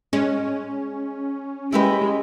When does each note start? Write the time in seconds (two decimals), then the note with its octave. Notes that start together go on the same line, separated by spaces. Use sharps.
0.13 G#3 C#4
1.72 G#3 E4 G4 B4